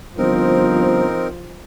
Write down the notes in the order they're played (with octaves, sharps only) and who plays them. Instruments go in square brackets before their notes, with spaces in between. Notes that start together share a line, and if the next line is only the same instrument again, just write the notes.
[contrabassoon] G1 [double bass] F3 [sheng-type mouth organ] C4 D#4 A#4